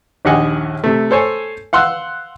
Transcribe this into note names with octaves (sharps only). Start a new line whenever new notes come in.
A#1 D#2 G4 D#5 F#5 G#5
C3 A3
A4 C5 C#5 G#5
F5 F#5 C6 E6 F#6